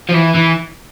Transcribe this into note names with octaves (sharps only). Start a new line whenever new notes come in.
F3
E3
E3